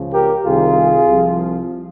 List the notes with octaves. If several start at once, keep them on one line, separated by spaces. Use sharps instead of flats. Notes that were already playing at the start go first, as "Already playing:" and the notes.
Already playing: C#2 C#3 F3
G4 A#4
C2 C3 D#3 F4 G#4
C2 C3 F3